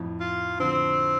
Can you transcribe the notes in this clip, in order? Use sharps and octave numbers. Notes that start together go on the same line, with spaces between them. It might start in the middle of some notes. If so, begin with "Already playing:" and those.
Already playing: F2 A2
F4
D3 F3 C4